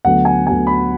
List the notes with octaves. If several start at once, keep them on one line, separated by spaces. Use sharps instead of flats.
D2 D3 F#3 B3 F#5
G#5
D2 D3 F#3 B3 G#5
B5